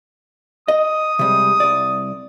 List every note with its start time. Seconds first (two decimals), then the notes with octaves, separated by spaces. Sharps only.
0.68 D#5 D#6
1.19 C3 G3 G#3
1.60 C2 D5